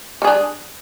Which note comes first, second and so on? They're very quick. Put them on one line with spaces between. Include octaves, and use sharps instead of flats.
G3 G#4 D4